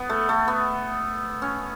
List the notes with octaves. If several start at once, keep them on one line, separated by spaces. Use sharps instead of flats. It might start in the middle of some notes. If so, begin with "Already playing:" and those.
Already playing: B3
A3
A3
B3
C#4